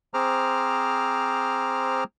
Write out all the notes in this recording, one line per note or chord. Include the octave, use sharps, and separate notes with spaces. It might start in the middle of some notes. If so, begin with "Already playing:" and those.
C4 G#4 C5 A#5 D6 F6